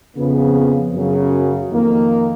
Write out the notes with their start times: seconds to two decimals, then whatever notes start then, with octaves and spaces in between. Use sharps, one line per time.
0.17 F2 C#3 F3 B3
0.93 F#2 C#3 F#3
1.70 F2 D#3 A#3